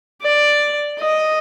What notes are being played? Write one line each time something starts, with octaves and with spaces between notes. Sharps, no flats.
D5
D#5